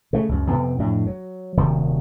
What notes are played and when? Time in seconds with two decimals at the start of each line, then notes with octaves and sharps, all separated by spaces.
0.13 C#3 A3
0.29 C#2 F#2
0.48 F2 C3 B3 C4
0.78 F2 A2 D4
1.07 F#3
1.57 D#1 C3 D#3 F#3